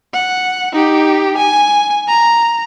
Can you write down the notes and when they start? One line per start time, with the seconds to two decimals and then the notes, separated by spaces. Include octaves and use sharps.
0.13 F#5
0.73 D#4 G4
1.38 G#5
2.08 A#5